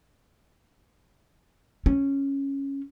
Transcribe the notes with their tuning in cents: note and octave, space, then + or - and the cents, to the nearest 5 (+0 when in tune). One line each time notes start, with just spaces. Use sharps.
C#4 -5